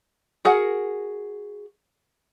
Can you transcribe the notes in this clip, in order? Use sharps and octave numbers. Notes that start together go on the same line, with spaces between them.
F#4 G#4 A#4 F#5